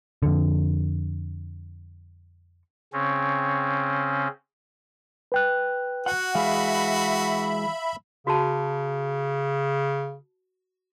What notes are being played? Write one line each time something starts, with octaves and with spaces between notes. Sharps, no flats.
F2 D3
C#3 C4 C#4
B4 G5 F#6
F#4 F#5
E3 G#3 G#4 E5 F5 B5
C#3 F#4 A5